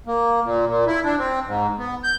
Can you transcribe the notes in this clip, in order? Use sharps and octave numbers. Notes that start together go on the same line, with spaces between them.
A#3
A#2
A#2
E4
D4
C4
G#2
B3
G6